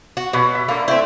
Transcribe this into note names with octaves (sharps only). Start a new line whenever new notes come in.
F#4
B2 B4 C#5 D6
E5
D3 A#3 A4
A3 C4 E4